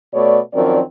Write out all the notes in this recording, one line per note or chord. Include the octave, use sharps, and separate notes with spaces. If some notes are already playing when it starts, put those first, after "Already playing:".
B2 A3 C#5 D5
F#2 D#3 F3 C4 D5